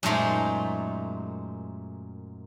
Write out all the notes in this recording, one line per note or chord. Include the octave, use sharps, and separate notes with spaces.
F#2 A#2 G#3 A3 D#4 C5